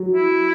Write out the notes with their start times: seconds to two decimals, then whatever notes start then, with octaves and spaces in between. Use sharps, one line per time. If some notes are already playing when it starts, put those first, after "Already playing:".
Already playing: F#3
0.12 E4